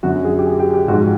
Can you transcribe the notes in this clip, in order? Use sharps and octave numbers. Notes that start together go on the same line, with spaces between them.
F#2 D3 F#3 F#4
G#4
G4
G#4
G4
G4
G#2 F3 G#3 F#4